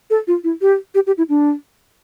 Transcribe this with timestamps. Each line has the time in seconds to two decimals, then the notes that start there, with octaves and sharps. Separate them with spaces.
0.10 A4
0.27 F4
0.44 E4
0.61 G4
0.95 G4
1.07 G4
1.18 E4
1.29 D4